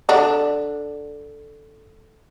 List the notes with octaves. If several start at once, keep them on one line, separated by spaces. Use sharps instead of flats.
D3 D4